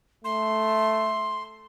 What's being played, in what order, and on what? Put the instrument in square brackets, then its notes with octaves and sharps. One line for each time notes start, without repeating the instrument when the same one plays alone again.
[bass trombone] A3 [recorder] C6